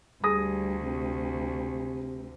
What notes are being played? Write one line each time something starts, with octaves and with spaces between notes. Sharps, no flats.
D2 G3 G#4 D#6 A#6
C3